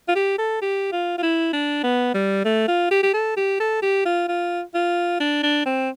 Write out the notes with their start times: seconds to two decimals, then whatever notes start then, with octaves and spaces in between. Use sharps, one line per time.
0.09 F4
0.16 G4
0.39 A4
0.62 G4
0.92 F4
1.18 F4
1.23 E4
1.53 D4
1.84 B3
2.14 G3
2.45 A3
2.68 F4
2.91 G4
3.03 G4
3.14 A4
3.37 G4
3.60 A4
3.82 G4
4.06 F4
4.29 F4
4.75 F4
5.20 D4
5.43 D4
5.66 C4